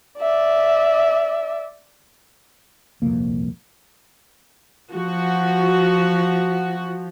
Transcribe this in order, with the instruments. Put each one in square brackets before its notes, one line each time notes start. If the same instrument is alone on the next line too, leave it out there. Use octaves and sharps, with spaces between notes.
[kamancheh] D5 E5
[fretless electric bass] D#1 C2 F2 A#3
[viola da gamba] F3 [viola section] F#4